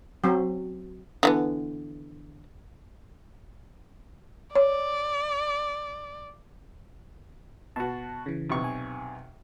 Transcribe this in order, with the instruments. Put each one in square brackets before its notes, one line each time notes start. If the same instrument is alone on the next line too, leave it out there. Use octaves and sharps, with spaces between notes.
[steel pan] F#3 C4
[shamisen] D3 E3 B3
[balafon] C#5 [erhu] D5
[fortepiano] B2 F#4 [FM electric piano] A5
[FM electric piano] C#3 E3
[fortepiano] B1 C3 C#6
[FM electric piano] G#5